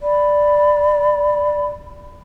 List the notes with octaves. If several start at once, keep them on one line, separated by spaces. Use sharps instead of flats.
D5 B5